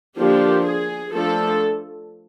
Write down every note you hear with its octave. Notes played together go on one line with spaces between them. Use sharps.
D3 F3 A#3 D4 G4
G#4
F3 A3 D4 A4